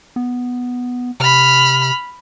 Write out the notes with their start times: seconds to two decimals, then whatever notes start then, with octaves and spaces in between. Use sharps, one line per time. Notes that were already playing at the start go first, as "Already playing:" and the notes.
0.16 B3
1.20 C3 B5 F6